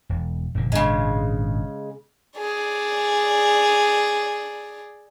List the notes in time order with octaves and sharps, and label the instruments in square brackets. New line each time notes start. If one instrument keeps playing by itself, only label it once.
[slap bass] E1
F1 A#2 D3
[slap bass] G#1 A#2 D4 [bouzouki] C#3 G#3
[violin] G#4 D5